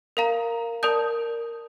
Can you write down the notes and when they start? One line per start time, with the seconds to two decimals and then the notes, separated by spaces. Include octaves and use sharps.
0.17 A#4 F5 A#5
0.83 A#4 D5 A5 D#6 G6